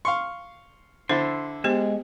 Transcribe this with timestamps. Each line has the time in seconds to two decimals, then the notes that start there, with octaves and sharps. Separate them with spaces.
0.05 F5 C6 C#6
1.09 D3 E4 C5 C6
1.64 G#3 B3 G4 C5